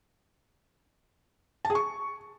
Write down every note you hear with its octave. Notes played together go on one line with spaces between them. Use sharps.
A5
G#4
C#6